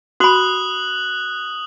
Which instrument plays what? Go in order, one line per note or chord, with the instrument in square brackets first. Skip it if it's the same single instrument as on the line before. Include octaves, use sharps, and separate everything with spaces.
[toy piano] F#4 B5 [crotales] D#6 F#6 F#7